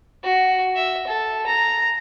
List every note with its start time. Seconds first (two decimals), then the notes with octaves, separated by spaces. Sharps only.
0.23 F#4
0.76 E5
1.07 A4
1.46 A#5